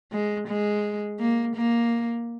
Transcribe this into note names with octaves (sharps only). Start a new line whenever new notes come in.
G#3
G#3
A#3
A#3